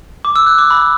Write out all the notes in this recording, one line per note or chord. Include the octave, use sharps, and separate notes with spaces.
D6
E6
F#6
D6
B5